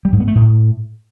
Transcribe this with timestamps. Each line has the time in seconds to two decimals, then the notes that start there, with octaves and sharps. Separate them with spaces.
0.05 G3
0.13 G#2
0.20 B3
0.28 A3
0.35 A2